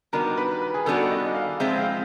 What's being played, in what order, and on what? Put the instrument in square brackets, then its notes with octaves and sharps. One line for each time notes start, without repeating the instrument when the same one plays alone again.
[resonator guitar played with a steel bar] D#3 G3 B3 D4 F#4 [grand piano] A#4
[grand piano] B4
B4
G#4
[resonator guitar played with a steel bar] D#3 G3 B3 D4 F#4 [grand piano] A4
[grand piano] D#5
F5
[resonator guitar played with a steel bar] F3 G#3 C4 [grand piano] E5
[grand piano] F5